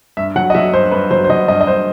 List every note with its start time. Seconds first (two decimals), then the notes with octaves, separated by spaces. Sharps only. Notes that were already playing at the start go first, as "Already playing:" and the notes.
0.17 G2 E5
0.36 F#3 F#5
0.50 D#5
0.55 F#3 E5
0.73 G2 C5
0.92 G2 B4
1.11 F#3 C5
1.24 C5
1.30 F#3 D#5
1.48 G2 D#5
1.61 D#5
1.67 G2 C5